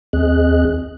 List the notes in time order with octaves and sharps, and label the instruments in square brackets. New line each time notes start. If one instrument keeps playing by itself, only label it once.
[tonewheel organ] D#2 C4 G#4 D#5 F#6